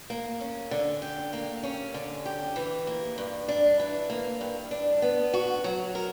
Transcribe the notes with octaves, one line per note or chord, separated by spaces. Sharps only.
A#3
C#4
D3
G4
A#3
C#4
D3
G4
E3
A#3
G2
D4
E3
A#3
G2
D4
B3
F#4
F#3
A#4